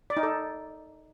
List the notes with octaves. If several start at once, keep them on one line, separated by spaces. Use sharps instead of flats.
D5
D#4
A4